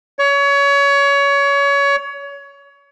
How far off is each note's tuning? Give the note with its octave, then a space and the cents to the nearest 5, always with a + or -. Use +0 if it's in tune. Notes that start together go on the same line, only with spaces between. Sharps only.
C#5 +25